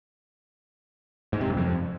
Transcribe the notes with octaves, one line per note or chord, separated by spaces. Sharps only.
G#2
C3
F#2
F2